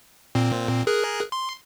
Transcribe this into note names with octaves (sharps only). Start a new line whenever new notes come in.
A#2 C4
G#4 A#4 F#6
C6